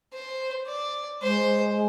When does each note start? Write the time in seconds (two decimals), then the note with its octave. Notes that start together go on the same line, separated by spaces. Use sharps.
0.13 C5
0.67 D5
1.21 G#3 C5